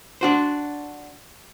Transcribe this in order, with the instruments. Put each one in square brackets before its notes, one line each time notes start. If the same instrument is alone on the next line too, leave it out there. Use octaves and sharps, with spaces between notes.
[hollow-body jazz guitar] D4 F#4 C5